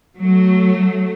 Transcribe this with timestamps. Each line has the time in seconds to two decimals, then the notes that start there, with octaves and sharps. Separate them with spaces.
0.18 F#3 A3